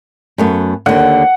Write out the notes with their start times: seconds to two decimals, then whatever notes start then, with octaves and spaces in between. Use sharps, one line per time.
0.38 F#2 A3 B3
0.86 D#2 D3 F#5